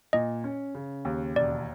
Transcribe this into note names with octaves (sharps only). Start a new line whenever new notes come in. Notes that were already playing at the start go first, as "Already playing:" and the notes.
A#2 D#5
C#4
C#3
D#2
E1 D5